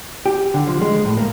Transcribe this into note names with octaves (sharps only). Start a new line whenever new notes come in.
G4
D3
F3
G#3
A2
A#3